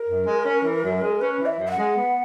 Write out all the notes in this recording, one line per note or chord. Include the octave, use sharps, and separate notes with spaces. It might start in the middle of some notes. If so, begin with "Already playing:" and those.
Already playing: A#4
F#2
G#3
C#4
E3
F#2
G#3
C#4 B4
E3
E5
F#2
E5
F#5
G#3
B3